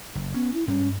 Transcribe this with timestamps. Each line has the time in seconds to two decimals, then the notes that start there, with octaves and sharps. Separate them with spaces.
0.15 F#1
0.34 B3 C#4
0.54 E4
0.68 G2 G3 G#3 C#4